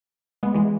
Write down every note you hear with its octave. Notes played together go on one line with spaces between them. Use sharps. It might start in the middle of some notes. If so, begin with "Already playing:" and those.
G#3 B3
E3 G#3